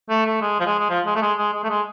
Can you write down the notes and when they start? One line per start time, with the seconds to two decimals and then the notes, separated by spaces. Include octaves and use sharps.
0.10 A3
0.26 A3
0.42 G#3
0.60 F3
0.66 G#3
0.79 G#3
0.90 F3
1.06 G#3
1.16 A3
1.22 G#3
1.38 G#3
1.54 G#3
1.64 A3
1.70 G#3